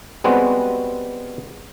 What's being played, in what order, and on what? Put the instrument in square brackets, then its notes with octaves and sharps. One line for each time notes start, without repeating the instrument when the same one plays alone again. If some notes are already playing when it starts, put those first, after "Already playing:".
[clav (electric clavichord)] G3 G#3 B3 C4 F#4